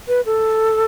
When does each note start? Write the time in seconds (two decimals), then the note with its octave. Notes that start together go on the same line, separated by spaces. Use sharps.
0.08 B4
0.26 A4